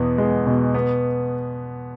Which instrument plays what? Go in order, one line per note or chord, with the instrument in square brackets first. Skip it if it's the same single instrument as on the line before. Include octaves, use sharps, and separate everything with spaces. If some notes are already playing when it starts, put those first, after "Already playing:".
Already playing: [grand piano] E2 B2 B3
G#3
B2
B3